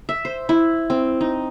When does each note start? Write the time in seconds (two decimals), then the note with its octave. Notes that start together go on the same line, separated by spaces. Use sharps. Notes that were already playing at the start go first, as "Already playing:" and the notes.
0.09 E5
0.25 C5
0.49 E4
0.90 C4
1.21 D#4